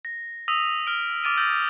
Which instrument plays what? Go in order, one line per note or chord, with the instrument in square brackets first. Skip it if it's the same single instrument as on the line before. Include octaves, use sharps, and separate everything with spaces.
[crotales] A#6
D#6 E6 A#6 B6 D#7 F7
F6 D7
D6 F6 A6 D7 D#7
E6 G6 A6 A#6